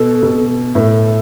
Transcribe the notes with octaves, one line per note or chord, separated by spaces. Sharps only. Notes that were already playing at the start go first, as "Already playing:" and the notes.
Already playing: B2 A4
B2
A2 A4 B4